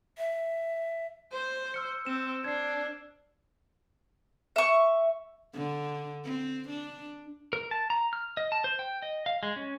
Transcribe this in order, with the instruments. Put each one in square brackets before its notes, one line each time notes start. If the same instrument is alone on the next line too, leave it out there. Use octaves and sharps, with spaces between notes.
[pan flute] E5
[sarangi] C5
[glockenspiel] E6 F6 C#7
[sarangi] C4 [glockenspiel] E7
[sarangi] D4 [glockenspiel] G#6 C7
[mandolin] E5 C#6
[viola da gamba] D3
C4
D4
[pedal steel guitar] A#4
A5
A#5
F6
D#5
A5
C5
G5
D#5
F5
G#3
C#4